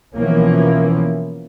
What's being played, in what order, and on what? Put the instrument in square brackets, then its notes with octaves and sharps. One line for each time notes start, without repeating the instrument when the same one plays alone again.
[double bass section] B2 E3 F3 A#3 C#4